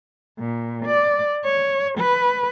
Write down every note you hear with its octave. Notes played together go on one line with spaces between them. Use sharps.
A#2
D5
C#5
B4